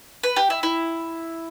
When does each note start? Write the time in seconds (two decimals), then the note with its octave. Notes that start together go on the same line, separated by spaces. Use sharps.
0.23 B4
0.36 G4
0.50 E4
0.63 E4